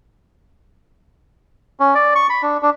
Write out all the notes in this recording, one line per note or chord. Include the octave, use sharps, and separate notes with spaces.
C#4
D5
C#6
B5
D4
D4